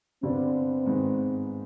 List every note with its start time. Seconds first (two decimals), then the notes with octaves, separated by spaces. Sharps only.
0.23 G2 D3 G3 B3 C4 D4
0.86 G#2 D#3 G#3 B3